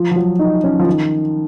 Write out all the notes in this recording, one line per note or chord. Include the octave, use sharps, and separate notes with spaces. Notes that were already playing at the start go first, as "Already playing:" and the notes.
Already playing: F3
F3
F#3
D#4
C#4
F3
D#3